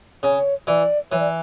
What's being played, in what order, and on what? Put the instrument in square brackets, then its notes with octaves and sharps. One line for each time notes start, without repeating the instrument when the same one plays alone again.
[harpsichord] C#3 [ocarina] C#5
[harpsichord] E3 [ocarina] D5
[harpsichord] E3 [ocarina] C#5
[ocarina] D5